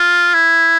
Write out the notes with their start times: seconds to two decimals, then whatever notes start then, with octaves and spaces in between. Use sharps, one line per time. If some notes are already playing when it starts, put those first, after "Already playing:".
Already playing: F4
0.34 E4